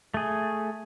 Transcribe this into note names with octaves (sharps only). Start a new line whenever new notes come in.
A3 G#4